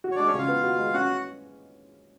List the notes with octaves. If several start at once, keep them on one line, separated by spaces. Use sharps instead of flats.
F#4
C#5
G#3 D4 D5
C#4 C#5
C#3 F4 F5
B3
F#4
G#3
C#4 F#4 F#5